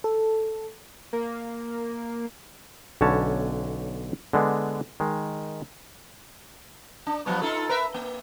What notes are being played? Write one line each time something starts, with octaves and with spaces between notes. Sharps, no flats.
A4
A#3
B1 D3 C#4 C#5 A5
D3 G#3 B3 D4
D#3 G#3
D4
F3 F#3 B3
D#4 F4 A4
A#4 B4 E5
A#3